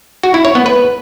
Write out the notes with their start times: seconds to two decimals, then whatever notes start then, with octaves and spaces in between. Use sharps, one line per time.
0.23 F#4
0.34 E4
0.45 C#5
0.55 B3
0.66 B4